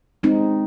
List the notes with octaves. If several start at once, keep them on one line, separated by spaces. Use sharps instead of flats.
G#3 C4 D#4